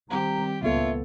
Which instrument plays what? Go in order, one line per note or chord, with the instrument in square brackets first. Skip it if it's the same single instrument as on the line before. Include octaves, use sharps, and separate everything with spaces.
[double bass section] D#3 G3 C4 [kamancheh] G4 [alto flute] A#5
[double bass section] C#2 A2 [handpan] A#3 B3 A4 [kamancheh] F4 C#5 [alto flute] E5